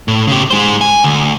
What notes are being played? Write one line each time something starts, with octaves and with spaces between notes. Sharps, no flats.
A2
C#3 G4
G#3 C5
G#5
D2